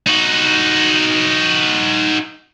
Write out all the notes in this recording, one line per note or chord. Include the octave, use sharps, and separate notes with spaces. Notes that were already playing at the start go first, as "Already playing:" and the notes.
D#4 F#4